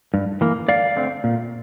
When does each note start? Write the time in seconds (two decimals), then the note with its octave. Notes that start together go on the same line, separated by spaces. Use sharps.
0.14 G2
0.41 E3 A#3
0.68 G2 D5 F5
0.96 D3 A3 C4
1.24 A#2